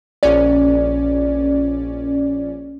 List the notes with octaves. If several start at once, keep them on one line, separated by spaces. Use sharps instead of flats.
A#1 C#4 D5